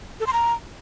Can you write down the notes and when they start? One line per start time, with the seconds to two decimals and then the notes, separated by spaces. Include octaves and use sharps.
0.20 A4
0.27 C6
0.33 A#5